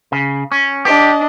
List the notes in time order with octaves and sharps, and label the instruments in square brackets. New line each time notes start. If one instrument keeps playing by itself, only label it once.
[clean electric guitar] C#3
C#4
[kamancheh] D4 D#5 [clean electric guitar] G4